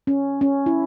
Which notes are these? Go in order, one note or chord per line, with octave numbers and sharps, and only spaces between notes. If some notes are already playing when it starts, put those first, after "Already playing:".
C#4
C#4
E4